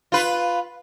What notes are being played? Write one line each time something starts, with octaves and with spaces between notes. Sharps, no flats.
F4 B4